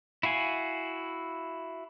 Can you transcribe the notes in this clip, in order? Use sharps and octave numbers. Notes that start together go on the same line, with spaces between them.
E4 F#4 F5 G#5